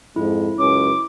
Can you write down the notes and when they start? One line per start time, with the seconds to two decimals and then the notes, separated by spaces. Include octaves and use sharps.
0.16 F2 G#2 E4
0.59 C#2 F#2 C#4 D6